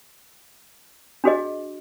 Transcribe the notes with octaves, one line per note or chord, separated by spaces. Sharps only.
D4 F#4 G#4 D#5